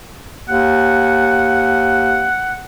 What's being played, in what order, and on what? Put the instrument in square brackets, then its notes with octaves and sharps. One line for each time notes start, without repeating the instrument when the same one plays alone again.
[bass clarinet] D#2 [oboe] F#5